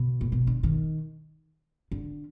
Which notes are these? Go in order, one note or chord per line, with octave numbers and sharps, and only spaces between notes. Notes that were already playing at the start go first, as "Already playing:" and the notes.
Already playing: B2
A#2
B2
D3
D#3
D3